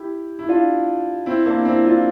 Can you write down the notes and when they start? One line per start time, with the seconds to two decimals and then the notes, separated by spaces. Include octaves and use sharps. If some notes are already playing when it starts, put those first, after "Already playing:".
Already playing: E4 G4
0.39 E4
0.49 D4 F4
1.26 C4 E4
1.46 A#3 D4
1.65 C4 E4
1.85 D4 F4